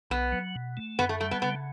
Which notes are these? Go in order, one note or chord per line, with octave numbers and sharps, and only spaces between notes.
B1 B3
F#3
B2
A3
F#2 B3
A3
G3 A3
B3
C#3 B3